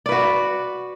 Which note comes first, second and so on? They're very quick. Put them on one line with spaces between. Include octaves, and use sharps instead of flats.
D5 B4 F#4